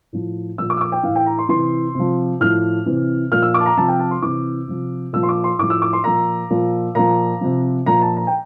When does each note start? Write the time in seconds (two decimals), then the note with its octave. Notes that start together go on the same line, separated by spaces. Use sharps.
0.13 A2 F3
0.58 A#2 F3 E6
0.70 D6
0.77 E6
0.81 D6
0.92 G5
1.03 E3 F5
1.07 A2
1.16 G5
1.26 A#5
1.39 C6
1.49 C3 E3 C6
1.95 C3 F3
2.40 A2 F3 F6
2.86 C3 E3
3.32 A#2 F3 F6
3.42 E6
3.54 D6
3.60 A5
3.66 A#5
3.77 C3 F3 A5
3.88 G5
4.00 A5
4.11 C6
4.22 C3 E3 D6
4.68 C3 F3
5.13 A#2 F3 E6
5.23 C6
5.29 D6
5.44 C6
5.58 A2 D6
5.63 F3
5.70 E6
5.82 D6
5.93 C6
6.04 A#2 F3 A#5
6.50 A#2 F3
6.95 A#2 F3 A#5
7.41 C3 F3
7.86 A#2 F3 A#5
8.02 A5
8.17 A#5
8.27 G5